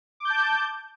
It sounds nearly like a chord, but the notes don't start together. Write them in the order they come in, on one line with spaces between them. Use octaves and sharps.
D6 G6 A5